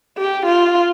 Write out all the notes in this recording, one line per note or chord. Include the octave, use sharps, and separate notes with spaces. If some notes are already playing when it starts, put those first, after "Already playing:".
G4
F4